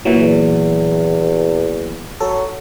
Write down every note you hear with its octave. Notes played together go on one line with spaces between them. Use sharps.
A#2 E3 F#3
E2
F#3 A4